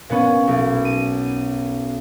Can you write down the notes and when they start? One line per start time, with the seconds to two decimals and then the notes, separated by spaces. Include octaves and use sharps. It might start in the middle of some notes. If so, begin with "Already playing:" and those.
0.09 A#2 B3 C#4
0.48 B1
0.85 D#7